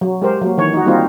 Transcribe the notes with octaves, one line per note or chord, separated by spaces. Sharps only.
F#3
G#3 G4 A#4 C5
F#3 A#3
D#3 E3 C#5
D#4 F#4
G3 A#3 C4 D#4 F4